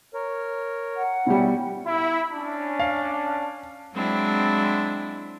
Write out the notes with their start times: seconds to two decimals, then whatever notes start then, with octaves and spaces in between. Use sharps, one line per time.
0.14 A#4 C#5
0.97 F#5
1.26 B2 G3 C#4 E4
1.86 E4
2.32 C#4 D4
2.79 F5
3.93 F#3 G#3 C4 D4 E4